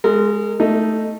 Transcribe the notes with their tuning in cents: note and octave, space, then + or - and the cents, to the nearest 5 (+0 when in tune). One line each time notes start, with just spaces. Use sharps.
G#3 +0 A#4 -35
A3 +0 D#4 +0